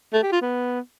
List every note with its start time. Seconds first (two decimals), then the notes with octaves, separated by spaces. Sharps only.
0.13 A3
0.23 G4
0.32 F4
0.42 B3